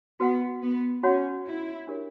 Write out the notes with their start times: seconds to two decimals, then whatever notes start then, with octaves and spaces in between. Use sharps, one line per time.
0.20 B3 F#4 B4 F#5
0.62 B3
1.03 C#4 F#4 C#5 F#5 B5
1.45 E4
1.87 D4 G4 A#4 C#5